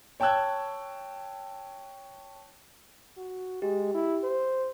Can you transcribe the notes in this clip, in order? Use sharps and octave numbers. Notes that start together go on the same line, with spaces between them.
C#5 G5 A5 E6 F#6 G#6
F#4
G#3 G4
E4
C5